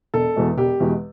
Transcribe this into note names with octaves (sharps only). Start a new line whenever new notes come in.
E1 A4
E2 B2 G#3
E1 G4
E2 B2 G#3